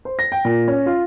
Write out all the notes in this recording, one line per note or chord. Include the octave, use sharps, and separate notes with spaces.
C5
A#6
G5
A#2
C#4
F4